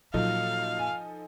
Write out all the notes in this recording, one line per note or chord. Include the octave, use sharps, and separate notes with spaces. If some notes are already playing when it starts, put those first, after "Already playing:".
A#2 F3 F#3 D#4 A4 F5
G#5